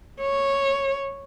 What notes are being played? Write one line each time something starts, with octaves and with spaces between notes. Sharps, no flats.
C#5